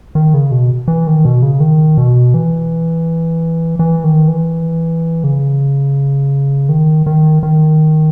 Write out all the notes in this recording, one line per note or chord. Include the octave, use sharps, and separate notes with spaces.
D#3
C#3
B2
E3
D#3
B2
C#3
D#3
B2
E3
E3
D#3
E3
C#3
D#3
D#3
D#3